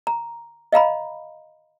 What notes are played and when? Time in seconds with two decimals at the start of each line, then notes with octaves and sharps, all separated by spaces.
0.07 A#5
0.72 D#5 F5 A#5 B5